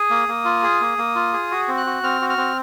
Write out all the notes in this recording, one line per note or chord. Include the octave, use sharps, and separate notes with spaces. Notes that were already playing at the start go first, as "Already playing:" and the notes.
Already playing: G#4 D#6
A#3
A#3
F4
G#4
A#3
A#3
F4
G#4
F#4
C4
F#6
F#4
C4 F6
F#4
F6
C4